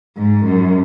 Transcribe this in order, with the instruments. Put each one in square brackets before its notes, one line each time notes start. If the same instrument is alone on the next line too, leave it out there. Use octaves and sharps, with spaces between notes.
[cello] G#2
F#2